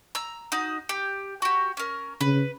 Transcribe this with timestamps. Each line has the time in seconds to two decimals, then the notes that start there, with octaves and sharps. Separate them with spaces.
0.15 A#5 E6
0.52 D#4 F#4 D#6
0.89 G4
1.42 F#4 G4
1.77 C#4 A#4
2.21 C#3 B4